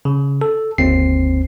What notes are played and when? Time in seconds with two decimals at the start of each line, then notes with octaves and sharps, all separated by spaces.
0.05 C#3
0.41 A4
0.78 G1 D#2 C4 C7